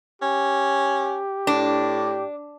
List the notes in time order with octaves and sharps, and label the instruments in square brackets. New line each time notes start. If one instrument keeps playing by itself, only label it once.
[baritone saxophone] C#4 [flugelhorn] G4
[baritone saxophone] A2 [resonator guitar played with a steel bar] D4